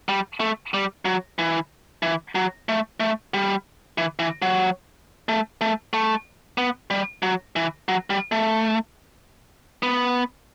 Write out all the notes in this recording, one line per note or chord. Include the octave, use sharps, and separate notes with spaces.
G3
A3
G3
F#3
E3
E3
F#3
A3
A3
G3
E3
E3
F#3
A3
A3
A3
B3
G3
F#3
E3
F#3
G3
A3
B3